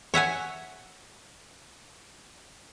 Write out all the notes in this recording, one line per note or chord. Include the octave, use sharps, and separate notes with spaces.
C#5 E5 F#5 G#5